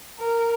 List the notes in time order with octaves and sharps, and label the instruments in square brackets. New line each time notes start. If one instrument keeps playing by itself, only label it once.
[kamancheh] A#4